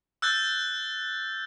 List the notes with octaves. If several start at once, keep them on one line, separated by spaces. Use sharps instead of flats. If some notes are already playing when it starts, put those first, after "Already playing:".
E6 F#6 G6 A6